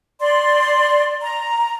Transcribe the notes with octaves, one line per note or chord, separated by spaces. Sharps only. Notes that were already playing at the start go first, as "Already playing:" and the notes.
D5 C6
A#5